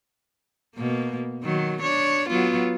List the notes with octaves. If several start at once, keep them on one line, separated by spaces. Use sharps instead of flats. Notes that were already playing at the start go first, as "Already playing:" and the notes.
B2 A#3
D#3 F#3
D4 C#5
F#3 B3 F4